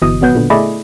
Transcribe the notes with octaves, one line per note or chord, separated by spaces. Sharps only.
G1 B2 E3 D#5 D#6
G#1 B2 F#3 B3 B4 G6
A#2 D3
A3 E4 G#4 D5 D#5 B5